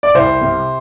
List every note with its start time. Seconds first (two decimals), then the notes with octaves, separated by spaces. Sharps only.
0.03 D5
0.14 C2 C5
0.41 C3